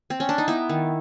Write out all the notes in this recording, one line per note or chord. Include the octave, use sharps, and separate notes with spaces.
C4
C#4
D4
D#4
B3 E4
D#3